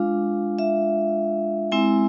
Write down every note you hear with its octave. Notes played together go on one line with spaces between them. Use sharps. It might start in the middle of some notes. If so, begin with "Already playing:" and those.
Already playing: G#3 D4 F4 F5
E5
G#3 C4 E4 G#5